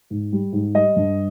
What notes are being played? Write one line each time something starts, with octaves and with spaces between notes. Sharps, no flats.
G#2
G3
G#2
G3 D#5
G2